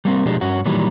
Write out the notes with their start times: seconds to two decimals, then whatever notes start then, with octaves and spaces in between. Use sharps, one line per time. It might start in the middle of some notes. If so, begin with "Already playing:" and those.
0.05 G3 A#3 C4
0.26 B2 F3 G#3 D4 G4
0.41 G2 C#4 F#4
0.65 A#2 D#3 E3 F#3 G3